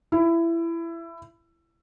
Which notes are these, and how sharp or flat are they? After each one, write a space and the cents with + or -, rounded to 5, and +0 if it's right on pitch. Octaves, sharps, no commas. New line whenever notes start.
E4 +20